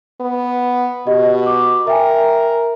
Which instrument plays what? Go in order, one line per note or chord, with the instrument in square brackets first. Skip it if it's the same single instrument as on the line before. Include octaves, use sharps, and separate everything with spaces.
[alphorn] B3
[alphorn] B2 [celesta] G4 D#5
[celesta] D6
[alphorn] A#4 [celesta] E5 G5 G#5